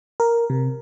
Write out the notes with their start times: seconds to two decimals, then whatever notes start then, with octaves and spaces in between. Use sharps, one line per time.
0.20 A#4
0.50 C3